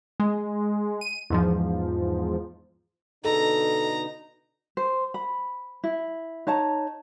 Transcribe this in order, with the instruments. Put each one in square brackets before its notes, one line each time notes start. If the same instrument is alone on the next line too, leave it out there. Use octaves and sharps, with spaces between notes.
[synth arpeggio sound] G#3
D#7
E2 G#2 F3
[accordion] B2 D3 D#4 [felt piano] A4 [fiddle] A#5
[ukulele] C5
B5
E4
D#4 C#5 A5 A#5